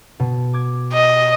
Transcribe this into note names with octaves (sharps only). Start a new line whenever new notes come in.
B2
D6 G#6
D#5